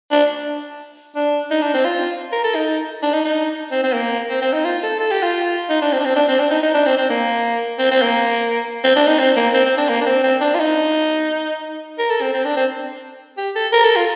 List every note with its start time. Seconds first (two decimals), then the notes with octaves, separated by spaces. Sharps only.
0.11 D4
1.16 D4
1.51 D#4
1.62 D4
1.74 C4
1.85 F4
2.32 A#4
2.44 A4
2.55 D#4
3.02 D4
3.13 D#4
3.24 D#4
3.71 C4
3.83 C4
3.95 A#3
4.29 C4
4.41 C4
4.53 D#4
4.64 F4
4.83 A4
5.00 A4
5.11 G4
5.23 F4
5.70 D#4
5.82 D4
5.92 C4
6.00 D4
6.05 C4
6.16 D4
6.28 C4
6.39 D4
6.51 D#4
6.63 D#4
6.74 D4
6.86 C4
6.97 C4
7.10 A#3
7.79 C4
7.91 C4
8.02 A#3
8.84 C4
8.96 D4
9.07 D#4
9.19 C4
9.36 A#3
9.54 C4
9.65 C4
9.77 D4
9.89 A#3
10.01 D4
10.06 C4
10.23 C4
10.41 D4
10.55 F4
10.59 D#4
11.98 A#4
12.10 A4
12.21 C4
12.33 C4
12.45 D4
12.56 C4
13.37 G4
13.55 A4
13.73 A#4
13.84 A4
13.96 F4